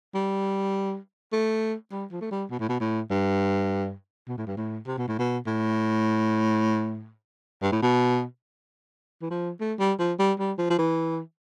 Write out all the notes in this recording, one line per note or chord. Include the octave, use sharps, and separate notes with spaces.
G3
A3
G3
F3
A3
G3
B2
A2
B2
A2
G2
B2
A2
G2
A2
C3
B2
A2
B2
A2
G2
A2
B2
E3
F3
A3
G3
F3
G3
G3
F3
F3
E3